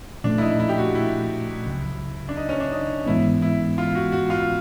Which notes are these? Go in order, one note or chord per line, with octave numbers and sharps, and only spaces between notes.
A#2 F3 A3 D4
E4
D#4
E4
G4
F#4
E4
C#2 C#3 F#3
D4
D#4
C#4
D4
D#4
G#2 E3 G#3 B3 E4
E4
F4
F#4
F#4
F4